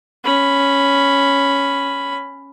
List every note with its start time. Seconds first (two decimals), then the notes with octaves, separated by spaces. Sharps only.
0.24 C#4 B5